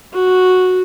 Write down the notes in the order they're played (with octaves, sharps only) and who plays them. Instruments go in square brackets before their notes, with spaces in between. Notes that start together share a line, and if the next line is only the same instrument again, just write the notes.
[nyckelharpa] F#4